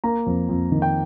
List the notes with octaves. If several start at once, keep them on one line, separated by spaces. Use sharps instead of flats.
A#3 A#5
F2
F2
D#3
G5